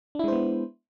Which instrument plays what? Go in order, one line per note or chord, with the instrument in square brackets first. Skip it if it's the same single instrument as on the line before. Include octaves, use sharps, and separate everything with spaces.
[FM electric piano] D4
E4
G#3
C5
B3